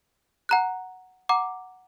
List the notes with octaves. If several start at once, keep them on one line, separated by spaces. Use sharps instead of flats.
F#5 A#5 F#6
F#5 A#5 D6